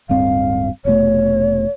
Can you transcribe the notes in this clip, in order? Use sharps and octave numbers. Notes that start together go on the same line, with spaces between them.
D1 G2 C4 F5
F1 B2 A3 C#5